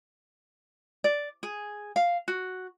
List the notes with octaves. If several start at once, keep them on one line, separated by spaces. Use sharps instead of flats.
D5
G#4
F5
F#4